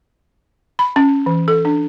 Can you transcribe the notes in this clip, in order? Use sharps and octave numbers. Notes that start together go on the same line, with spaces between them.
B5
C#4
E3
A4
D4